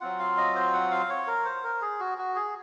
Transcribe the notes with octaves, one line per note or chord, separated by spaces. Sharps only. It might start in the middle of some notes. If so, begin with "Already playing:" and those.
F#3 C4 F4 F#5
F5
D#5
C5
F#5
F5
C#5
A#4
C5
A#4
G#4
F#4
F#4
G#4